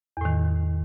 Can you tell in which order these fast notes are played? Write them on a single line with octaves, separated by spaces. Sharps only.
E2 A2 D#3